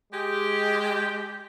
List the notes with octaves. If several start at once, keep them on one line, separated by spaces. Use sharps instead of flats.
G#3 G4